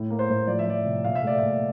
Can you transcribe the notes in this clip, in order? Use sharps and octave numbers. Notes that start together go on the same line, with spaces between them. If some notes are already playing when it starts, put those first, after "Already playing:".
Already playing: A2
A#3
C5
A2
F3 D5
E5
F3 D5
C3
A#2 F5
E5
A3 D5
E5
A#2